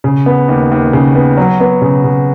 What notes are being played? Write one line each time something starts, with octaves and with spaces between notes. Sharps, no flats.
C#3
B3
D#2
D#2
C#3
B3
F#3
B3
C#3
C#3